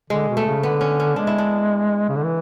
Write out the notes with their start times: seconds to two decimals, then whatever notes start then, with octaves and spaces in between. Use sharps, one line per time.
0.10 D3 G#3
0.29 B2
0.37 A3
0.46 C#3
0.63 D3 B3
0.81 C#4
1.00 C#4
1.16 G#3 D4
1.27 E4
1.38 D4
2.09 C#3
2.16 D3
2.23 E3